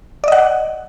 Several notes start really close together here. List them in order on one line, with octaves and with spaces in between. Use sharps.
D5 D#5 F#5